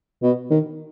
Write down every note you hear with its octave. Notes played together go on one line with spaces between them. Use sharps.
B2
D#3